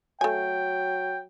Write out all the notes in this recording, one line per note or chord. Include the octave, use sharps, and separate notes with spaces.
F#3 A3 G5 G#5